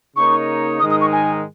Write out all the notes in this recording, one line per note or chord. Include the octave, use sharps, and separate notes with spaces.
C#3 A#3 D#4 A#4 C#5 C#6
G#2 D#3 G#3 D#4 A#4 D#6
D#6
C#6
G#5